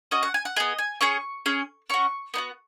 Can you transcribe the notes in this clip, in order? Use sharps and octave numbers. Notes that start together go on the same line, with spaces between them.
C#4 F#4 D#5
F#5
G#5
F#5
B3 G#4 D#5
G#5
C#4 G#4 C#6
C#4 G#4
C#4 F#4 C#6
B3 D#4 F#4